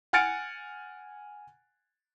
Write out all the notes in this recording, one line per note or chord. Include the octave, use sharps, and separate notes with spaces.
F#5 G#5 F6 A6 C#7 D7